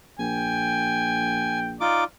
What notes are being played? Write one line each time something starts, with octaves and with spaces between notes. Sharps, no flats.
A#1 G5 G#5
D#4 F4 D5 D6